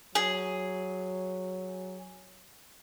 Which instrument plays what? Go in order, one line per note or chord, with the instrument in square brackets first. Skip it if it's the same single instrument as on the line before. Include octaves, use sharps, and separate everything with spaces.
[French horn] F#3 [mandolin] G#4